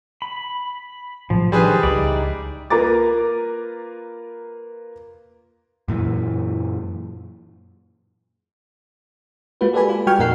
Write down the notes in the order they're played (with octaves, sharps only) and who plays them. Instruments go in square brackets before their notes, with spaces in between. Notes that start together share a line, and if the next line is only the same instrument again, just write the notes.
[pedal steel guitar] B5
[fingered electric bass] A2 F#3 [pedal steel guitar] F3
[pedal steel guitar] D#3 C5 [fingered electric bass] F3 D4 [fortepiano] G3 G#4 B4
[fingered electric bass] C#2 [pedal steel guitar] D#4 E4 D5
[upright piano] A#3 F4 B4 A#5 D6 A6
[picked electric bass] F#2 A#2 E3
[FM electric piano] G#3 A#3 F4 F#4 B4
G4 A4 B4 D5 G#5 B5
F4
G3 F#4 G5 C#6 F6 G#6
F2 A#2 D#4 A#4 F#5 C7